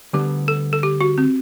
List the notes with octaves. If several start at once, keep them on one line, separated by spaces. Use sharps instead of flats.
D2 D3 G3 B3 G4
A4
A4
G4
F#4
C4